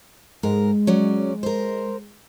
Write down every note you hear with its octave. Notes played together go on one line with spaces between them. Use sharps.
G#2 G#3 A#4
F#3 C#4 D5
A#4 C5